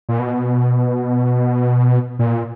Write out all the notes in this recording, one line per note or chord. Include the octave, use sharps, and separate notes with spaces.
A#2
B2
A#2